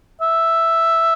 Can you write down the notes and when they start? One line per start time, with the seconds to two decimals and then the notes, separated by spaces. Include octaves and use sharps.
0.21 E5